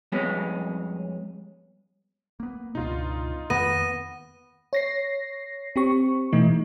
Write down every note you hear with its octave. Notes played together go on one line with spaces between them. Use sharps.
F2 G3 G#3 B3 C#4
A#3 B3
C#2 G2 B2 D#4 F4
F2 D#3 A#3 B3 A#6 D#7
C#5 A#6 C7
C4 G4 C#6
B2 E3 A3 D#4